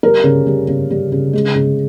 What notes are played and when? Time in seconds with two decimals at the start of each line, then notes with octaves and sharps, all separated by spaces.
0.03 G3 A#4
0.24 C#3
0.47 G3
0.68 C#3
0.90 G3
1.12 C#3
1.33 G#3
1.56 C#3